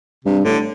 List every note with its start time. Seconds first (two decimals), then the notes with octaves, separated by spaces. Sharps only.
0.25 G2 C3
0.44 A2 D3